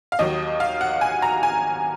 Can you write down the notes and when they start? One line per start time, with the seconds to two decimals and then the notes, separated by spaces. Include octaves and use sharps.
0.12 F5
0.19 D#2 D#3 F#3 D#5
0.60 F5
0.81 F#5
1.01 G#5
1.22 A#5
1.43 G#5